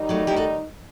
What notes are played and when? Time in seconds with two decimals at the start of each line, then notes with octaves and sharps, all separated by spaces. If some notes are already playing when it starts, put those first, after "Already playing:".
Already playing: D#3 G3 D#4
0.09 F#3 A3
0.27 E4 G4
0.36 F#4 A4